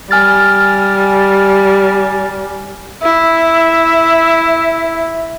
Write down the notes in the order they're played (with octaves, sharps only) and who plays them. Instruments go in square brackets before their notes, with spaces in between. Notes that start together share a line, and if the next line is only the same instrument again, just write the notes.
[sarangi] G3 [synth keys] G#5 F6 A6
[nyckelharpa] E4 [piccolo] E5